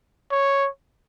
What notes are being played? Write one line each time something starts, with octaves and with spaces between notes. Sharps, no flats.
C#5